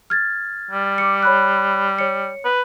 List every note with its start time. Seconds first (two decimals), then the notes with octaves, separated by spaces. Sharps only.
0.10 F6 G#6 A6
0.71 G3
0.98 D6 C#7
1.23 C#5 B5 F#6
1.98 C#5 C#7
2.45 B4